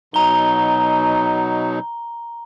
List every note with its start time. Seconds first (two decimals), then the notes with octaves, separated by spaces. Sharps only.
0.14 B2 F#3 D#4 A#5 G7